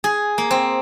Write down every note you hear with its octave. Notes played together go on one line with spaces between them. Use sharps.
G#4
A#3
C4